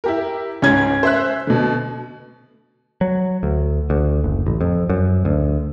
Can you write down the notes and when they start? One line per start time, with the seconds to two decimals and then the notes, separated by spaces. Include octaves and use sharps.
0.04 E4 G4 A#4
0.62 C#2 G#2 C#4 G#6
1.03 C5 E5 F#6
1.47 B2 D3
3.01 F#3
3.43 D2
3.90 D2
4.24 F#1
4.46 A1
4.61 F2
4.89 F#2
5.25 D2